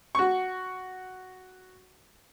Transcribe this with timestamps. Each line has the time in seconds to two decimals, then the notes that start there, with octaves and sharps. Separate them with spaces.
0.15 F#4 C#6